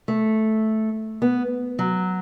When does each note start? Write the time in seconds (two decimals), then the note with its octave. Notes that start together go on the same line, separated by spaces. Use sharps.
0.08 A3
1.22 B3
1.79 F#3